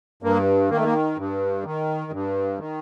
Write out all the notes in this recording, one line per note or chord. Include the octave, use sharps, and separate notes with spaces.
G2 A#3
D#3 A#3
A3
A#3
G2
D#3
G2
D#3